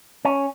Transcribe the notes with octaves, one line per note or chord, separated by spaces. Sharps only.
C#4